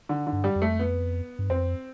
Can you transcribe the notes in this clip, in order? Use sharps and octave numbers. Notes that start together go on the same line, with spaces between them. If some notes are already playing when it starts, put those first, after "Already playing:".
D3
D3
G2
G3
F2
A3
B3
G2
F2 C4